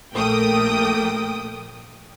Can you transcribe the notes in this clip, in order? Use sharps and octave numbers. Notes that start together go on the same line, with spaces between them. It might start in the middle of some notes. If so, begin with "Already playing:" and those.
A#1 A3 A#3 G5 D#6